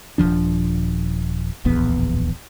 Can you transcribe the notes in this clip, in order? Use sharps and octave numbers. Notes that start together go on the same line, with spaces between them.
D#1 F#2 F3 D4
D1 A#1 E2 B3